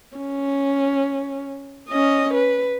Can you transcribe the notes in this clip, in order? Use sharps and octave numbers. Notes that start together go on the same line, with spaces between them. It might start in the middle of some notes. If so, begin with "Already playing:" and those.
C#4
C#4 D#5
B4